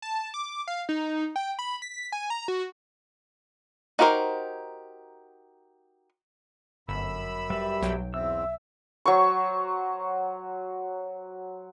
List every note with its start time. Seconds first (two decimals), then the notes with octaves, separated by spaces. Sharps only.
0.02 A5
0.34 D6
0.68 F5
0.89 D#4
1.36 G5
1.59 B5
1.82 B6
2.12 G#5
2.30 A#5
2.48 F#4
3.99 D#4 F#4 G4 A#4 C5
6.88 G1 F#2 B5 E6
7.50 G3 B4 E5
7.82 B1 F#3 G5
8.14 E2 C4 E5 E6
9.06 F#3 C5 C#6